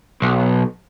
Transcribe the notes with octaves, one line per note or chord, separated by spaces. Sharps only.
B1